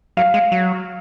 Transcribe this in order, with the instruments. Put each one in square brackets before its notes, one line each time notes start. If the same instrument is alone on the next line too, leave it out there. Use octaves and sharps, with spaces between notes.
[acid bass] F#3 [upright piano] F5
[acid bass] G#3
F#3